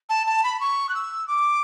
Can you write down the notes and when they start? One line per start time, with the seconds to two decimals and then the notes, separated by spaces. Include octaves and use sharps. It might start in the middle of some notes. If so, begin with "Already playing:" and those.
0.09 A5
0.27 A5
0.44 B5
0.60 C#6
0.89 F#6
0.94 E6
1.27 D6